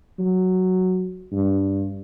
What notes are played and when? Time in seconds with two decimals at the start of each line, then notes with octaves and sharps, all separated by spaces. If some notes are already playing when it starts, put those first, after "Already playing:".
0.19 F#3
1.32 G2